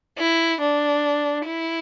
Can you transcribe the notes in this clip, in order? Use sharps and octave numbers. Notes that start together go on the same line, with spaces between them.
E4
D4
E4